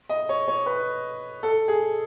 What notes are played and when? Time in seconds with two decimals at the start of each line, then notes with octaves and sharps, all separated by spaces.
0.09 D#5
0.29 C#5
0.48 C#5
0.66 B4
1.43 A4
1.68 G#4